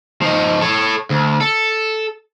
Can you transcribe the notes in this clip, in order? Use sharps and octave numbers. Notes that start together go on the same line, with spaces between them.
F3 D#4
A4 C#5
D2
A4